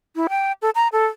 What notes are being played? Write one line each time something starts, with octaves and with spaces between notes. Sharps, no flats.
E4
G5
A4
A#5
A4